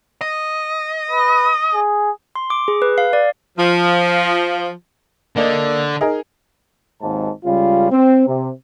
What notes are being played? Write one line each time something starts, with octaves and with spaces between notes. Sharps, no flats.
D#5
B4
G#4
C6
D6
G#4
B4
F5
D5
F3
D3 A#3 D5 D#5
D#4 G#4 A#4
G#1 D#2 G#2 A5
C#2 C#3 G3 F4
C4
C3